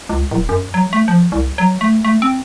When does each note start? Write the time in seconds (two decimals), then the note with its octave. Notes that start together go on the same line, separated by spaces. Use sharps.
0.09 C#2
0.31 D1
0.49 F#2
0.74 F#3
0.93 A3
1.08 F3
1.32 C2
1.58 F#3
1.81 A3
2.05 A3
2.22 C4